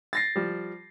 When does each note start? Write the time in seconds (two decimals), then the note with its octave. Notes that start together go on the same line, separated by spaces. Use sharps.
0.13 A6 A#6 C7
0.36 F3 G3